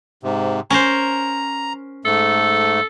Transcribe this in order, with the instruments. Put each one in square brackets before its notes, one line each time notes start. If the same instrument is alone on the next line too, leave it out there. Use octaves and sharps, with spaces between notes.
[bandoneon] G#2 C3
[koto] C#4 A#4 C5 [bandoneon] A#5
[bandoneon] G#2 A3 [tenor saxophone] A4